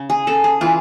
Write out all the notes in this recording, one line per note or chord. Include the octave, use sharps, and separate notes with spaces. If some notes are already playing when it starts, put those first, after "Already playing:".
Already playing: C#3
G#4
C#3 A4
G#4
E3 F4